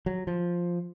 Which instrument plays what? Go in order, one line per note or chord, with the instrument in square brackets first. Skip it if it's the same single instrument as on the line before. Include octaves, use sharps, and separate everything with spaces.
[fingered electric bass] F#3
F3